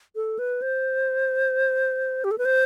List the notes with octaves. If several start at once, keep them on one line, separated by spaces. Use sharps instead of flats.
A4
B4
C5
G4
A4
B4
C5